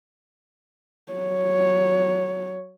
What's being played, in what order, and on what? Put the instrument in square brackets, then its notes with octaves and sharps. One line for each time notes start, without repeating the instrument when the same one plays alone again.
[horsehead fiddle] F#3 C#5